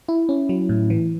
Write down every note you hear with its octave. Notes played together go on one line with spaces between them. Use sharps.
E4
C#4
F#3
A2
E3